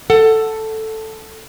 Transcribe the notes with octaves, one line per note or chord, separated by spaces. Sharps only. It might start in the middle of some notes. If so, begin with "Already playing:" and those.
A4 F#5